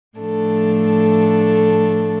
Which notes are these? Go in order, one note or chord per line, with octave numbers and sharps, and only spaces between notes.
A2 F3 A3 D4 A4